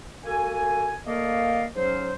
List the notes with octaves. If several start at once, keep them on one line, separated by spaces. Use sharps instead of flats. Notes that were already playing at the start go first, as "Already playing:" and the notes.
A#3 F#4 A4 G#5
A3 A#3 A#4 D5 D#5 F5
G#2 F#3 C#4 C5